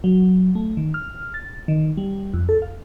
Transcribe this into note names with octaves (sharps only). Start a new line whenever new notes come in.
F#3
A3
D#3
F6
A6
D#3
G3
F2
A4
F5